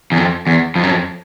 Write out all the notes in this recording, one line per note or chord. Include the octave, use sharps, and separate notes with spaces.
E2
F2
E2
F2
F#2
F2